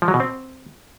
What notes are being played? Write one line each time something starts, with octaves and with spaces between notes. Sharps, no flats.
F3
F#3
B2
C4